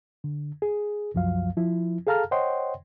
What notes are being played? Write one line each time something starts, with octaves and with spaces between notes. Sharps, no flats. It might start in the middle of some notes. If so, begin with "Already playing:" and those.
D3
G#4
C2 F#2 F3 F#3 F5
F3 E4
G#4 A4 F5 A5 A#5 F6
C5 C#5 D#5 F#5 G5 C6